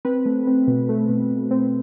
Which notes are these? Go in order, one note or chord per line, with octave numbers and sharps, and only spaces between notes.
C4 B4
A3
C4
B2
A3
B2
B2
C4